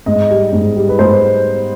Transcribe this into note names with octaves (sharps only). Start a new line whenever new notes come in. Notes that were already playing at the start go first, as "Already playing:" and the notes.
G#2 D#5
G3
G#2
G3
B4
G#2 C5